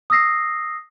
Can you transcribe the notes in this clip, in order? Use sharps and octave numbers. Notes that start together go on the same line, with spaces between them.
D#6 E6 A#6 C7